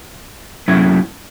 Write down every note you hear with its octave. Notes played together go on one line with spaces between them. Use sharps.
F#3 A3 C#4 E4